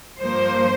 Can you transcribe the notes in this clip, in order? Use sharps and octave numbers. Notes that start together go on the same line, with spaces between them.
G2 F3 A#3 C5